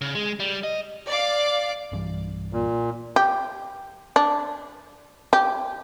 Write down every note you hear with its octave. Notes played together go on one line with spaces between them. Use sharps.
C#3
G#3
G3
D#5
D5 F5 D6
B1 G2 E3
A#2
G4
D4
G4